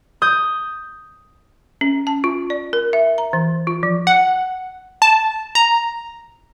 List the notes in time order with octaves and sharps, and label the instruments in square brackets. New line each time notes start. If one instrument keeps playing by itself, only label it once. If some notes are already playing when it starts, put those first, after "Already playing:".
[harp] D#6 G6
[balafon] C#4
A5
F4
D5
A#4
E5
A#5
E3
F4
F3
[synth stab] F#5
A5
A#5